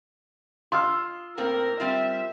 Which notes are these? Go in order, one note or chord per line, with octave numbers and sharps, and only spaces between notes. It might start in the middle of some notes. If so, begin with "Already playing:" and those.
F4 C6 E6 F6
A2 A#3 C4 A#4
G3 C4 F4 E5